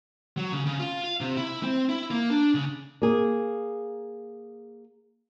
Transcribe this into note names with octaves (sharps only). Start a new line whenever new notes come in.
F#3
C#3
C#3
F4
F5
C3
E4
C4
E4
A#3
D4
C#3
A#3 G#4